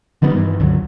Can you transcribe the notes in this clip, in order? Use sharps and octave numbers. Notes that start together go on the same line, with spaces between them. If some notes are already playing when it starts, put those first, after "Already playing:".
D3 D#3 G3 B3
G2 D#3 E3
C#2 G2 D3 F#3